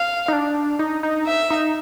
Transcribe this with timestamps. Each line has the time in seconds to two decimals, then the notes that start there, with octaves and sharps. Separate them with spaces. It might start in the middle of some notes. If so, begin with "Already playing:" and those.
Already playing: F5
0.28 D#4
0.33 D4
0.79 D#4
1.03 D#4
1.26 E5
1.50 D#4